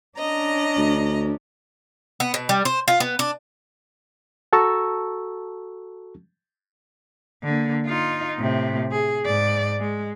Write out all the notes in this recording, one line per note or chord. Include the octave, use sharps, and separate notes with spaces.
C#4 D4 D#5 A#5
D2
B3
B2
G3
C5
F4
B3
D4
F#4 A4 A5 A#5 C#6 E6
D3 A#3
D#4 F4
A2 C3
G#4
G#2 D5
G#3